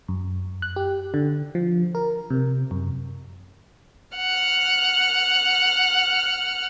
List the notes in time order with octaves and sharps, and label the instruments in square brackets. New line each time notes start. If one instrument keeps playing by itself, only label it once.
[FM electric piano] F#2
F#6
G4
D3
F3
A#4
C3
F#2
[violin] F#5 F6